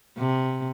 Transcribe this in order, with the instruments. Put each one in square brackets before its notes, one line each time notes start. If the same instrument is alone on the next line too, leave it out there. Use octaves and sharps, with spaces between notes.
[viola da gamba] C3